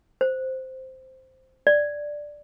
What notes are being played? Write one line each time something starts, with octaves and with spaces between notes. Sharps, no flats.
C5
D5